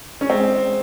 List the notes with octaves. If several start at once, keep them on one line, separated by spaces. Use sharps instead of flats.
C#4
G#3 C4